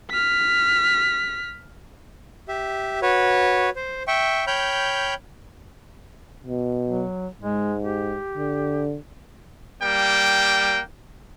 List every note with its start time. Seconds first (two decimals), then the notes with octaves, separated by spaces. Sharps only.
0.11 F6 B6
2.48 G4 E5
3.02 F#4 B4 C#5
3.76 C5
4.08 E5 G5 C#6
4.47 C#5 G5 B5 F6 G6
6.47 B2
6.88 F#3
7.42 G#2 G#3
7.83 G4
8.37 D3
9.83 G3 A#3 G5